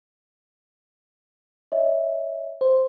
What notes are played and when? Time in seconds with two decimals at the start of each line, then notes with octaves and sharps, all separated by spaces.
1.72 C#5 D#5 E5
2.61 C5